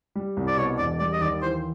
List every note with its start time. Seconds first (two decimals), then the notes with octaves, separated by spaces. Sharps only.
0.15 G3
0.37 C2
0.48 D5
0.57 B2 C#5
0.78 E1 D5
0.99 G3 D5
1.13 D#5
1.21 D#2 D5
1.42 E3 C5